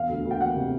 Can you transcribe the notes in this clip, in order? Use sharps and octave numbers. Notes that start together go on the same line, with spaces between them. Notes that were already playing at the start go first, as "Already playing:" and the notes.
Already playing: E1 F5
D2
D2
G5
E1 F#5
C3